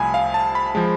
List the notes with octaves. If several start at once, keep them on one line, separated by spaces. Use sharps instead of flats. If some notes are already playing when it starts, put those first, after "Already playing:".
Already playing: C2 C3 F3 A3 G#5 B5
F5
A5
B5
F3 G#3